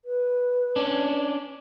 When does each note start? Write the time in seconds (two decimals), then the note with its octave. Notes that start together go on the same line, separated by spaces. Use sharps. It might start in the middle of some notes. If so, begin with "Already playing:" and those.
0.05 B4
0.76 C#4 D4